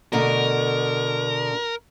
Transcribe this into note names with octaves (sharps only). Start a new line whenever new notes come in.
B2 D3 A3 A#4